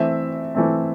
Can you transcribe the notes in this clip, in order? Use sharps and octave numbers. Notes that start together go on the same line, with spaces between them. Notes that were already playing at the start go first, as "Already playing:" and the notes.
Already playing: E3 A3 C4 E5
E3 A3 C4